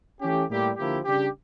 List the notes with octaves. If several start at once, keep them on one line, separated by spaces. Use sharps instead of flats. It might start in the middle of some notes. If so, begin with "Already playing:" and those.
E3 A3 C#4 G4
A2 G3 A#3 E4 G4
D3 F3 A#3 E4 G4
C#3 G3 D4 G4